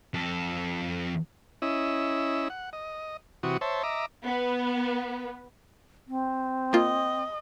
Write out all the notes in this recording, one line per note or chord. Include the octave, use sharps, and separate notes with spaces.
F2 A4
C#4 E4 D#5 E6
F#5
D#5
C3 E3 F#4 C#6 D#6
C5 C#5 E5 A5
D#5 E5 A#5 D6
B3
C4
A#3 F4 D#5